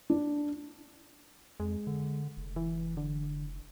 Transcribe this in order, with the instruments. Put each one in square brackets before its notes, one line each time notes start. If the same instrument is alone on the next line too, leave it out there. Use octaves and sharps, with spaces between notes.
[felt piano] D4
[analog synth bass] F2 [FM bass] G#3
[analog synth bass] D3
F1
[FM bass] E3
D3